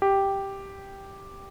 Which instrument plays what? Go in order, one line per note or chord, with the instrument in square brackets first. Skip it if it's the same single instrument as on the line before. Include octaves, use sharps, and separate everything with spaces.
[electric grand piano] G4